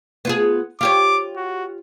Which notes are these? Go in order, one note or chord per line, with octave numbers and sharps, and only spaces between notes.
B3 F4 G#4
F4 G4 C#5 D6
F#4